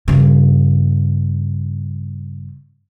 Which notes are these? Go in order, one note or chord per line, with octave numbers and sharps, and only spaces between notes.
G2 C#3